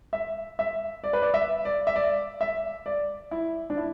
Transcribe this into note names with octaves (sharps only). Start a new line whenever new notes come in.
E5
E5
D5
B4
D5
E5
D5
E5
D5
E5
D5
E4
D4
E4